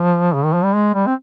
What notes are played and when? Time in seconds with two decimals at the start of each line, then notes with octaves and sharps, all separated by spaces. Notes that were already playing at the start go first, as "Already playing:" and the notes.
Already playing: F3
0.34 C#3
0.45 D#3
0.54 F3
0.64 G3
0.75 G#3
0.94 G3
1.07 C4